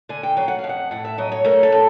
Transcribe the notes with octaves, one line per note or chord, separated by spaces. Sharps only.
D3 G#5
G5
F#3 G5
F#5
F5
F2
F#5
A2 F#5
E5
F#3 D#5
C#5
A3 A#4
A4
A2